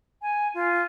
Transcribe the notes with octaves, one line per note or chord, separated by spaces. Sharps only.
G#5
F4